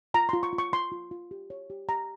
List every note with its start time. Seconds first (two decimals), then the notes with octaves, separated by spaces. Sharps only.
0.14 F4 A#5
0.29 C6
0.33 F4
0.43 C#6
0.53 F4
0.58 C#6
0.73 F4 C6
0.92 F4
1.11 F4
1.31 G4
1.50 C#5
1.70 G4
1.89 G4 A#5